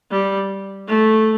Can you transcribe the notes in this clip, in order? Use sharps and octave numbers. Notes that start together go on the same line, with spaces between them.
G3
A3